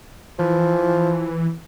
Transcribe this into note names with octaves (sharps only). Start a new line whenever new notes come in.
E3 F3